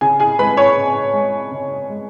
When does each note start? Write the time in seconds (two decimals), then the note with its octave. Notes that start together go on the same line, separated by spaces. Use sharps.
0.01 C#3 G#4 G#5
0.20 G#4 G#5
0.39 G#3 B4 B5
0.57 C#5 C#6
0.76 C#3
1.13 G#3
1.52 C#3
1.89 G#3